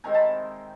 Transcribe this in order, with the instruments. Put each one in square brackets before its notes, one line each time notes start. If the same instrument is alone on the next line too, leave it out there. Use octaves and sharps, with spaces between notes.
[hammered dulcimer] C3 D#3 G#3 C4 G#5 A#5
A5 B5